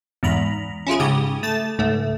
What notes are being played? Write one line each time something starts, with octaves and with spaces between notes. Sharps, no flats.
E2 G#2 A#5 B5
C#4 E4 F4 G#4
G#2 C#3 G4 D#6
A3 A5 A6
C#2 G#2 A3